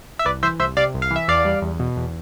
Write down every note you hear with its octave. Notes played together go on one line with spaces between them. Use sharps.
E5
C2 B4 D5
E3 C5 E5
C2 C5 E5
C3 D5 F5
C2
F5
E3 E5
E2 D5 F5
G3
E2
B2
E2